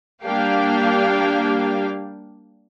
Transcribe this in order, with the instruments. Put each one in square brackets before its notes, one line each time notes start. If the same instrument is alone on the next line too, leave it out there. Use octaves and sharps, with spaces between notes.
[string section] G3 A#3 D4 G4 F5 G5